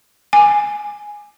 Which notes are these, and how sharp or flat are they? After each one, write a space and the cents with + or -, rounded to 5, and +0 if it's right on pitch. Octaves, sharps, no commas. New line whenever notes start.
G#5 -5